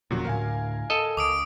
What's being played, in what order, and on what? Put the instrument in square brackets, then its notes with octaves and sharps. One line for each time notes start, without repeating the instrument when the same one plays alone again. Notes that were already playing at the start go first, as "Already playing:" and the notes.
[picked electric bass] E1 C#3 F3 [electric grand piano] A#2 F#3 F#4
[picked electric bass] D2 A2 [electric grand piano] A#4 F5 G#5
[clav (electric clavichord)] A4 D#5
[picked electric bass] C#2 [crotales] D6 D#6 D7